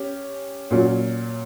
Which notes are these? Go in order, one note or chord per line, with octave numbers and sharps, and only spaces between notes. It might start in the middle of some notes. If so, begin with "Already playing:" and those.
Already playing: C#4 G4
A#2 F#3 C#4